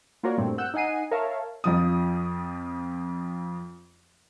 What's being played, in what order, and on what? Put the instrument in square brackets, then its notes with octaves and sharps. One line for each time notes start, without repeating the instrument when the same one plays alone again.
[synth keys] A#3 F4 F#4 A#4 C#5 D5
G2 A#2 A3 C4
F#5 E6 F#6 G6
D#4 D#5 F#5 G#5 C7 D#7
A#4 C#5 E5 F5 A5
[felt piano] F2 F3 D#6